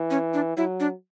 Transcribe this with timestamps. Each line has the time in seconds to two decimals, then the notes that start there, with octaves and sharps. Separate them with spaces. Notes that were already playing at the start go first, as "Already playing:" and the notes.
Already playing: E3
0.10 C#4
0.34 D4
0.57 F#3 E4
0.80 D4